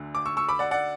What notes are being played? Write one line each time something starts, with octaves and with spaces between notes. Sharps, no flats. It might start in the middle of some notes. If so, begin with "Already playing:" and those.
Already playing: D2 D3
D6
C#6 E6
C#6 E6
B5 D6
D5 F#5
D5 F#5